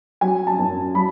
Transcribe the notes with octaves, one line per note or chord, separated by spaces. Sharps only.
F#3 G#5
A5
F#2
F#3 B5